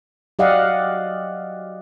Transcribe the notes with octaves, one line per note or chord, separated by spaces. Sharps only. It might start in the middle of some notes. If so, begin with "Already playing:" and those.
F#3 G4 D5 D#5 F5 F#5